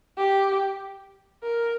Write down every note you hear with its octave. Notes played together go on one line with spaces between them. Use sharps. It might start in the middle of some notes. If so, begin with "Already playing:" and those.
G4
A#4